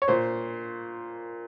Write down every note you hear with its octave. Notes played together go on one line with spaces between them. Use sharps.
C#5
A#2 C5